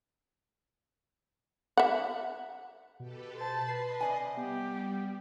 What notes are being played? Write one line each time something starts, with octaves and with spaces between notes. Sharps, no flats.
E5 F#5
B2 G4 A4 B4
C5 A5 B5
B4 D#5 C7
C3 D5 G#5
G3 B3 G4